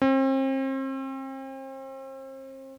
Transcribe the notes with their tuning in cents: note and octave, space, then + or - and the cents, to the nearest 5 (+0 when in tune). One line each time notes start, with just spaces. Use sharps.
C4 +40